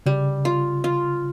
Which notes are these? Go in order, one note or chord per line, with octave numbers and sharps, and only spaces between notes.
C#3 G3
F4
F4